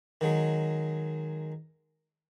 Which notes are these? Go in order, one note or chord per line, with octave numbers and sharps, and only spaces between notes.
D#3 F#3 G#3